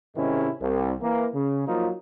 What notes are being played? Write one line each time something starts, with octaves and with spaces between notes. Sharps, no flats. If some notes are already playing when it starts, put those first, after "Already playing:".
G#2 C3 D#3 G#3 C#4 E4
C2
E3 A#3
C#3
F3 F#3 A#3 D#4 F4